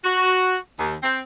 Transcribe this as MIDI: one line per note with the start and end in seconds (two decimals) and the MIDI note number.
0.04 0.56 66
0.78 0.95 39
1.03 1.20 60